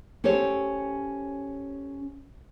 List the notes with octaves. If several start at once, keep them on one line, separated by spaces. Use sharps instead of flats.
C#4 G4 A4 C5 C#5